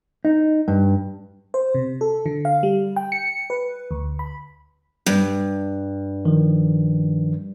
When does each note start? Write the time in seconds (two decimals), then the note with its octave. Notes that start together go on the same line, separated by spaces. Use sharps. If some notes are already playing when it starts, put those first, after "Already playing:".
0.25 D#4
0.68 G2
1.54 C5
1.75 C3
2.01 A4
2.26 D3
2.45 F5
2.63 G3
2.96 G5
3.12 C#7
3.50 B4
3.91 D2
4.19 B5
5.06 G2
6.25 D#3 F3